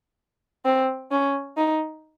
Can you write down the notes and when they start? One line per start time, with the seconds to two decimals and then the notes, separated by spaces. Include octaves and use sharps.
0.65 C4
1.11 C#4
1.57 D#4